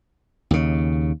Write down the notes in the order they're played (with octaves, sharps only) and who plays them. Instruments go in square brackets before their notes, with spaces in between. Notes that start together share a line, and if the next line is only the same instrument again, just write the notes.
[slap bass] D#2 C#3